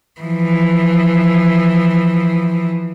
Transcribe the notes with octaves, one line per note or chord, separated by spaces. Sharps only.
E3 F3